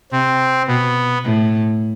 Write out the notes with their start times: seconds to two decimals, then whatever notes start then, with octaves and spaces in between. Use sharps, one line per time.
0.12 C3 C4
0.68 B2 B3
1.24 A2